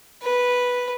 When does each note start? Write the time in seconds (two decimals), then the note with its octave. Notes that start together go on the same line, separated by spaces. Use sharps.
0.22 B4